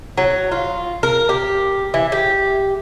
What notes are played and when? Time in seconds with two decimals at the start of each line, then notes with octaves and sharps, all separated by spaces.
0.18 F#3
0.52 F4
1.03 A#4
1.29 G4
1.94 E3
2.12 G4